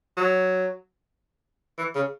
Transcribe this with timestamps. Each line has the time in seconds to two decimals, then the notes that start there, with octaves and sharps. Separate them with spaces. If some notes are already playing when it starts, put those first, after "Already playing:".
0.17 F#3
1.78 E3
1.95 C#3